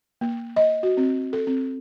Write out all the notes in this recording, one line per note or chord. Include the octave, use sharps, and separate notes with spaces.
A#3
D#5
F#4
C4
A4
C4